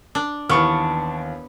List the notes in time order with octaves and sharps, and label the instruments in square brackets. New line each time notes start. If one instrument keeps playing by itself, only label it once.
[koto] D4
[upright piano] D#2 E3 [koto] B3 [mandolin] D4 C#6 F6